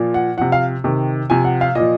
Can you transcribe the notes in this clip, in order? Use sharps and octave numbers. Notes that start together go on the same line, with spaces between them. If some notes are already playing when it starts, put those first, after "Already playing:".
Already playing: A#2 F3
F#5
C3 F3 F#5
F5
C3 D#3
C3 F3 G#5
F#5
F5
A#2 F3 D#5